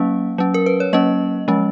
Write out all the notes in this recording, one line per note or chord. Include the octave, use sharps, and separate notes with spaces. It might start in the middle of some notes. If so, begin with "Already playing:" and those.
Already playing: F#3 A#3 C#4 F5
F#3 C#4
A#4
B4
C#5
F#3 A#3 C#4 D#5
F3 G#3 C#4